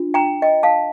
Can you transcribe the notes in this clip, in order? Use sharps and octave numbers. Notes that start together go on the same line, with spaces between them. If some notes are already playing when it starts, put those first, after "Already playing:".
Already playing: D4 F4
G5 A#5
D#5 G5
F5 A5